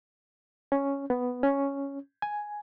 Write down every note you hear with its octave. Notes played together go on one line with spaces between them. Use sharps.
C#4
B3
C#4
G#5